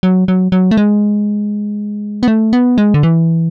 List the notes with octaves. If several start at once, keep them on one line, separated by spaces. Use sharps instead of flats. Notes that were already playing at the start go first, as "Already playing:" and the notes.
F#3
F#3
F#3
A3
G#3
B3
A3
B3
G#3
D3
E3